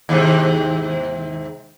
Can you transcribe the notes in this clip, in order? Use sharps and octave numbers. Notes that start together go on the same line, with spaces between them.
D#2 G#2 C3